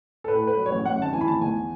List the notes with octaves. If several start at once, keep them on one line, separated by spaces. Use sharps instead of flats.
A4
A2 B4
A3 B4
F#3
C#5
A1
F#2 F#5
G#1 A5
E3 G#5
B5
G#1 A5
E2 G#5